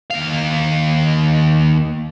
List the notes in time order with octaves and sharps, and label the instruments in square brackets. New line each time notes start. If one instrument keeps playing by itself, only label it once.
[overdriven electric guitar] D#2 F5